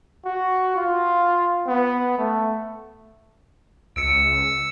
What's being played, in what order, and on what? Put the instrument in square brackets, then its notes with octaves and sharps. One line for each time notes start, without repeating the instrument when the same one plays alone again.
[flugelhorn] F#4
F4
B3
A3
[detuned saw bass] C#2 [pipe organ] E6 [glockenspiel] C#7 D7